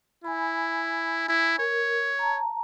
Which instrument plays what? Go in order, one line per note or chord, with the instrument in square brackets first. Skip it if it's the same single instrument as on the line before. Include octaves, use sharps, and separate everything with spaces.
[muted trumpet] E4 [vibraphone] G#5 B5
[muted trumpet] E4
[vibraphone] A#4 [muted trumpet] C#5
[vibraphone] A5 A#5